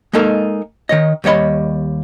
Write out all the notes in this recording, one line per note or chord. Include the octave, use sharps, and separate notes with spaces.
G#3 A#3 D#4 A4 A#4
D#3 C#5 D#5
D#2 G3 C#5 D#5 B5